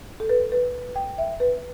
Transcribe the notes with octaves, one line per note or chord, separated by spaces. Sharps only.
A4
B4
B4
G5
E5
B4